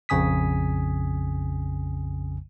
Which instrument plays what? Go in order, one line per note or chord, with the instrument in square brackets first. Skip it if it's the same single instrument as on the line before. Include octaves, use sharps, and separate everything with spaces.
[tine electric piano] A#1 F2 C#3 G#5 D#6 B6